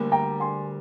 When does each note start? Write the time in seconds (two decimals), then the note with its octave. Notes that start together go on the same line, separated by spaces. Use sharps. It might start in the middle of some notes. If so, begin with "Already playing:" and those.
Already playing: D2 D3 G3 A#3
0.12 G5 A#5
0.40 G#5 C6